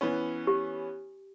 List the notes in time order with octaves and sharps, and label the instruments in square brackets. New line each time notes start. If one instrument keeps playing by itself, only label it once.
[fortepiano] E3 B3 C#4
[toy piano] G4